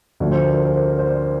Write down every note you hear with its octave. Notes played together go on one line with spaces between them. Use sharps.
D2 D3 F3 D5
C5
A#4
A#4
A#4
C5
A#4
C5
D5